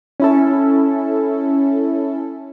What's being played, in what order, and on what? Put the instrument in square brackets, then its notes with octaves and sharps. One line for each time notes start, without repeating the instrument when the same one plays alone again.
[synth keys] C#4 E4 A4